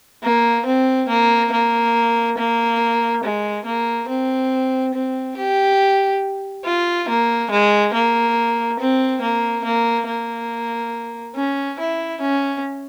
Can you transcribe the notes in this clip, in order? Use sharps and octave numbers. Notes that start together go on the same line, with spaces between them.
A#3
C4
A#3
A#3
A#3
G#3
A#3
C4
C4
G4
F4
A#3
G#3
A#3
C4
A#3
A#3
A#3
C#4
E4
C#4